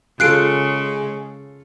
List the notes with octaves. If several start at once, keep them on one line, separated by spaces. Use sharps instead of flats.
C#3 G#3 F4 A4 F#6 C7 D7